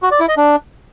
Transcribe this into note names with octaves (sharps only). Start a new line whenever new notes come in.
F#4
D5
E4
D#5
D4